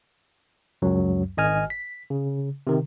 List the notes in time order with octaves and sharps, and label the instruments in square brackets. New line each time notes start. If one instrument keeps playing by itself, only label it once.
[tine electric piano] C#2 F#2 F#3
G#1 D#5 G#5 F6
B6
C#3
C3 D#3